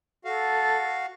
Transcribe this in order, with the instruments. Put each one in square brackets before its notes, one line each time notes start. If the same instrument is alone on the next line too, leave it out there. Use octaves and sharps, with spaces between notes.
[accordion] F#4 F5 [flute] A4